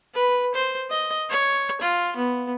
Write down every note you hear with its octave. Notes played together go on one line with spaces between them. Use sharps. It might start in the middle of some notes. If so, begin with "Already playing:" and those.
B4
C5
D#5
C#5
F4
B3